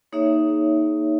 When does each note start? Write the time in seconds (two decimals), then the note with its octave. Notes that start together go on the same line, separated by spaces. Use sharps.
0.12 A#3 D#4 G#4 C#5 E5